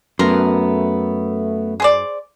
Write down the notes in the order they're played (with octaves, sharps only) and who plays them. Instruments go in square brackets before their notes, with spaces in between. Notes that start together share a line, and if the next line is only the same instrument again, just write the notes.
[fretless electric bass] F#2 [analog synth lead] A3 [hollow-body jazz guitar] B3 C6 [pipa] A#4
[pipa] G#4 C5 D5